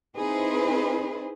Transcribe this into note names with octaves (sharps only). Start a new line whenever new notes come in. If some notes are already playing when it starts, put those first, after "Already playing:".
C4 D#4 E4 G#4 B4 C5